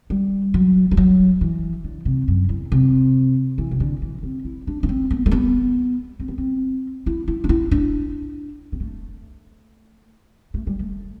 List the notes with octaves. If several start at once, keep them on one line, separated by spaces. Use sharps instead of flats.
G3
F#3
G3
F#3
E3
D3
C3
F#2
E2
C3
E3
C3
D3
E3
C4
E4
D4
D4
C4
B3
A3
B3
C4
B3
C4
E4
E4
D4
E4
D4
B3
A3
A3
G3
A3